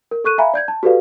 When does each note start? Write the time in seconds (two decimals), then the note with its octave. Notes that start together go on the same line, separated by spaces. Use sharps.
0.11 A#4
0.24 A4 C#6 F#6 D#7
0.38 E5 F5 G#5 A#5 B5
0.54 D5 G6 G#6
0.68 A5
0.83 F#4 G4 A4 B4 D5 F5